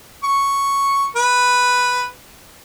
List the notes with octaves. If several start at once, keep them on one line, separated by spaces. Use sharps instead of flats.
C#6
B4